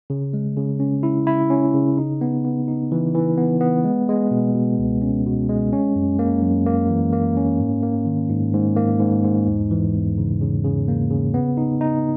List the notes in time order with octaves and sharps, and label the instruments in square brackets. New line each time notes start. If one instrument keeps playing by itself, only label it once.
[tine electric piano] C#3
G#3
C#3
C#4
E4
E4
C#4
C#3
D#4
B3
B3
D#4
E3
E3
B3
B3
G#3
G#3
B2
B2
C#2
C#4
B2
G#3
C#4
F#2
A#3
F#2
A#3
E3
A#3
C#4
G#2
A#3
D#3
G#2
G#2
A#3
G#2
G#2
E2
E3
E2
C#3
C#3
C#3
A#3
C#3
B3
D#4
D#4